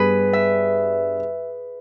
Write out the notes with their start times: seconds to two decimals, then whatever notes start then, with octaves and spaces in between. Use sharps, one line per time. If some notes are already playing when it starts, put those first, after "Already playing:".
Already playing: G2 G3 B3 G#4 B4
0.33 E5